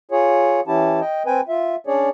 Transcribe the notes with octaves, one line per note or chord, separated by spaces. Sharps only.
F4 G#4 C#5
E3 C#4 E4 G4 A5
D#5 G5
C4 B4 G5 G#5
F4 E5
C#4 D4 G#4 C#5 D5